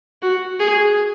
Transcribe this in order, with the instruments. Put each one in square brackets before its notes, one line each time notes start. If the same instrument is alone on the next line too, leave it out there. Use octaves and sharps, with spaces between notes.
[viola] F#4
G#4